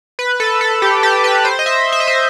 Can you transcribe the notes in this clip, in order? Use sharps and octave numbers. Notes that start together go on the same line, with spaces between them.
B4
A4
A4
G4
G4
B4
C5
D#5
E5
E5
D#5
C5